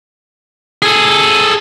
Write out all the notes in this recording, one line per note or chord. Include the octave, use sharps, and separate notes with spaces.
G#4 A4